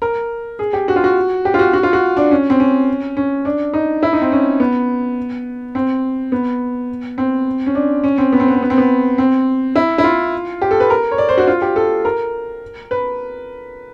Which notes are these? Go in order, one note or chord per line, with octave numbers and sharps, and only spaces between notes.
A#4
G#4
G4
F#4
F4
F#4
G4
F4
F#4
F#4
F4
F#4
D4
C#4
C4
C#4
C#4
D4
D#4
E4
D#4
C4
C#4
B3
C4
B3
C4
C#4
D4
C#4
C4
B3
C4
B3
C4
B3
C4
B3
C4
E4
E4
F4
G4
A4
B4
A#4
C#5
D5
C5
F#4
F4
G4
A4
A#4
B4